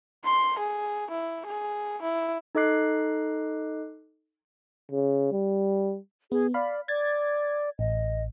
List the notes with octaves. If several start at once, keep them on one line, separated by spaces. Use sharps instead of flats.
C6
G#4
E4
G#4
E4
D#4 A4 D#5 D6 F#6 C7
C#3
G3
B3 G#4
D5 F5 B5
D5 G#6 A6
A1 D#5